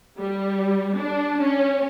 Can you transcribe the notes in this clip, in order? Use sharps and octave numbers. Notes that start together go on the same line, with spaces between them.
G3
D4
C#4